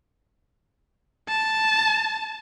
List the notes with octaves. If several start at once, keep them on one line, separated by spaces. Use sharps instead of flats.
A5